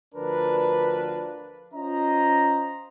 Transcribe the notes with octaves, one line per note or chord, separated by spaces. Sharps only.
D2 F3 D4 A#4 B4
C#4 F4 C5 D#5 A#5